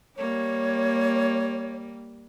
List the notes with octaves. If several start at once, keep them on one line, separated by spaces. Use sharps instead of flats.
G3 A#3 C#5